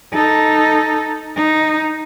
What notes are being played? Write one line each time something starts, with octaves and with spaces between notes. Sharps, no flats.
D#4 A4
D#4